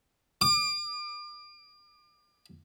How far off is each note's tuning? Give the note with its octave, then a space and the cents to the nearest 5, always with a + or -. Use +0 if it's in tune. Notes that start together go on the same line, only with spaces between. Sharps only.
D6 +35